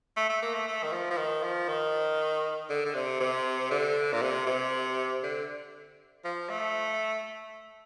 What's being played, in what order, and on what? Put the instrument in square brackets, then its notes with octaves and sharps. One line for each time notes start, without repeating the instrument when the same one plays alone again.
[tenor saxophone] A3
A3
A#3
A3
A3
D#3
F3
F3
D#3
F3
D#3
D3
D3
C3
C3
D3
A#2
C3
C3
D3
F3
A3